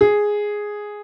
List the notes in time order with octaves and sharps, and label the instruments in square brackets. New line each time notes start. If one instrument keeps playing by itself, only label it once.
[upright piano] G#4